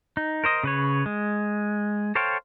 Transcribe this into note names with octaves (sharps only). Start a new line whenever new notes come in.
D#4
A#4 C5 D#5
C#3 B4 C#5
G#3
A4 C5 C#5 F5 G5